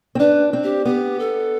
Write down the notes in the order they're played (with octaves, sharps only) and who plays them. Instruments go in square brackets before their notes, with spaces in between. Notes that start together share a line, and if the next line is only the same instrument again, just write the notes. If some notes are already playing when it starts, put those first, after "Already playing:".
[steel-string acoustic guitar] C4
[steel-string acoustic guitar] D4 [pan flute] B4
[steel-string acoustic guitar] C4
[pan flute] G4
[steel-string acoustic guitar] B3 [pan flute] G4
[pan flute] A4